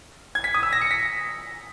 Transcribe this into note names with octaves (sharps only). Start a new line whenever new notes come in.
G#6
B6
D#6
E6
A#6
C#7
B6